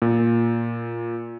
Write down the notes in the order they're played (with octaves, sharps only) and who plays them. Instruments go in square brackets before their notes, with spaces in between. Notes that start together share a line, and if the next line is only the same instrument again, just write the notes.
[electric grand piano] A#2